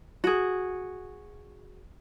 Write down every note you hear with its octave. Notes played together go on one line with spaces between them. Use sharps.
F#4 G#4